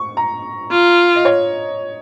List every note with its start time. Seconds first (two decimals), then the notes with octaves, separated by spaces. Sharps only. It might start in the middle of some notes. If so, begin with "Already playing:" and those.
Already playing: C#6
0.17 A#5
0.71 F4
1.15 D#5
1.25 C#5